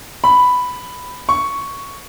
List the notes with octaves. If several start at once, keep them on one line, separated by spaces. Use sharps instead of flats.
B5
C#6